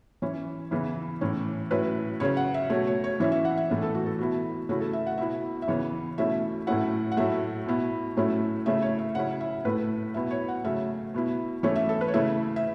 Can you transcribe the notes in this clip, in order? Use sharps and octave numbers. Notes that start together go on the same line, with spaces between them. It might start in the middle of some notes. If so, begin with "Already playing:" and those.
E3 C#4 E4
C#3 E3 B3 E4
A2 E3 C#4
A2 F#3 C#4 E4 B4
C#3 F#3 C#4 C#5
F#5
E5
B2 F#3 A3 C#5
C#5
C#5
E3 C#4 E4 E5
E5
F#5
E5
A2 E3 A3 C#4
A4
F#4
A4
B2 B3 E4 F#4
C#3 A3 C#4 E4 F#4
A4
E5
F#5
B2 B3 E4 E5
E5
C#3 E3 B3 C#5
B2 A3 C#4 E4 E5
A2 F#3 A3 C#4 E4 F#5
F#5
A2 F#3 A3 E5
B2 B3 E4
A2 F#3 A3 C#4 E4
C#3 A3 C#4 E4 E5
C#5
E5
C#3 F#3 C#4 E4 F#5
E5
A2 A3 E4 B4
B2 B3 E4 E5
C#5
F#5
C#3 F#3 A3 C#4 E5
B2 B3 E4
E3 A3 C#4 E4 C#5
E5
A4
B4
C#5
C#3 A3 E4 E5
E5